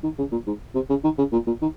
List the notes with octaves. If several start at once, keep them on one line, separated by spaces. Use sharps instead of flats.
D#3
C#3
A#2
G#2
C3
C#3
D#3
C#3
A#2
A#2
D#3